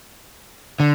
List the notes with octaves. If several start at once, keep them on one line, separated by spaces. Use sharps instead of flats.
D3